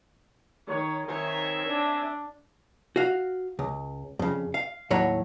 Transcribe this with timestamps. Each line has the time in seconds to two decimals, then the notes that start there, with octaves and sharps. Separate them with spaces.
0.67 D#3 C#5
1.08 D#3 C4 C#5 E5 G#5
1.69 D4
2.96 F#4 F5
3.59 C#2
4.19 F2 C#3
4.54 F5
4.90 D#2 A2 F#3 C#5 B5